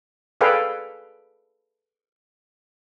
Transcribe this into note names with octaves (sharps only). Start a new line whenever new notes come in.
G#4 A4 B4 D5 F5 G5